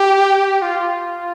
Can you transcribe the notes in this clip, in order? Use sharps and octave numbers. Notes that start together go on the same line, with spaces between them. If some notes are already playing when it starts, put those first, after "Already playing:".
Already playing: G4
F4